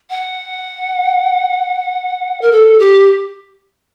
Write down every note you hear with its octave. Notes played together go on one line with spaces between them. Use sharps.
F#5
A#4
A4
G4